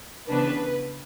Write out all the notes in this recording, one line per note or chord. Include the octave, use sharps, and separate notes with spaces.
C#3 E3 B3 D4 B4